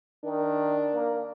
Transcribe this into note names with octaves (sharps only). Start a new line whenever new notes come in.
D#3 D4
A#3